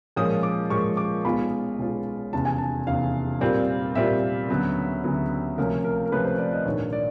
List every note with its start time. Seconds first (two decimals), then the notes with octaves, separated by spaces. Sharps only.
0.16 A#2 F3 G#3 C#4 D#6
0.43 D6
0.70 A#2 F3 G#3 C#4 C#6
0.97 D6
1.25 B1 B2 G#3 C#4 F4 B5
1.79 B1 B2 G#3 C#4 F4
2.33 F1 E2 C#3 A5
2.45 G#5
2.58 A5
2.87 F1 E2 C#3 F5
3.41 A#2 G3 C4 F4
3.95 A#2 G3 C4 F4 E5
4.49 D2 C#3 F#3 B3
5.03 D2 C#3 F#3 B3
5.57 C#2 C3 F3 A3 C#4 A#4
5.84 A#4
6.06 A#4
6.12 C#2 C3 F3 A3 C#4 B4
6.25 C5
6.38 D5
6.53 D#5
6.66 A#1 G#2 D#3 C#5
6.93 D5